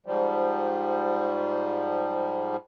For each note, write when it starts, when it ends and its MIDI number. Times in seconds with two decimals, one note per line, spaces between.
0.06 2.56 44
0.06 2.56 53
0.06 2.56 55